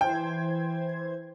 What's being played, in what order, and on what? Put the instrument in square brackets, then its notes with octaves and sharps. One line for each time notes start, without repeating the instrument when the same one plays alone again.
[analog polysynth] E3 C5 G#6 [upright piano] G5